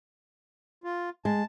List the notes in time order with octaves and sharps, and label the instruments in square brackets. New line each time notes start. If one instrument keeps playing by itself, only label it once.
[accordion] F4
[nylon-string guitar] G#3 [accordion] A5